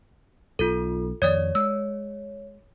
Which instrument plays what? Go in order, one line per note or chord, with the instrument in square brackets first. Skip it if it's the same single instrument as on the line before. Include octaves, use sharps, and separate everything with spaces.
[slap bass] B1 [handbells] F4 A4
[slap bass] F2 D#3 [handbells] C#5 [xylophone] D5 D#6 G#6
[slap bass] G#3 [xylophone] E6